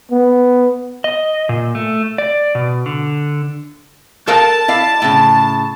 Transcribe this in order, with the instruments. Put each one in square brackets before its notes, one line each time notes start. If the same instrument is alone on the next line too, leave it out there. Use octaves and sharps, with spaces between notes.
[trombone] B3
[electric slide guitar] D#5
A#2
A3
D5
B2
D3
[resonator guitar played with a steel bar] A4 A#4 F5 [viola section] A5
[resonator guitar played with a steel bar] E4 D5 F5
A2 C#3